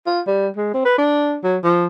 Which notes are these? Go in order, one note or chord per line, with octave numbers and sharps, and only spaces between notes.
F4
G3
G#3
C4
B4
D4
F#3
F3